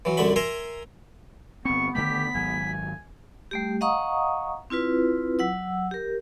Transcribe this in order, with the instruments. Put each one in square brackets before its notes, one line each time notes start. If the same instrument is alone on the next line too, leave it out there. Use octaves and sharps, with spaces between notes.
[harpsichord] E3 F#3
C2 F#2 D3 D4 F#5 B5
A#4 E5 G#5 A#5 C6
[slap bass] G1 C4 [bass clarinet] B3 [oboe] C#6
[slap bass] D3 D#3 A3 [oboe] G4 [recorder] B6
[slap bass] G#1 F#3 [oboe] G#5
[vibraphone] G3 A3 G4
D#5 F5 F#5 A#5 C#6 D#6
C4 E4 F4 B4
F#3 F#5 E6
G4 A#4